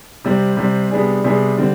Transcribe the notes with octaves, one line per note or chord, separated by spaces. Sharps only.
C3 G3 C4
C3 G3 C4
C3 G3 B3 D4 G#4
C3 G3 B3 D4 G#4
D3 G3 C4